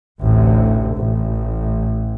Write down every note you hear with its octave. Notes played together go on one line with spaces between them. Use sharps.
A1 D2 C3
A1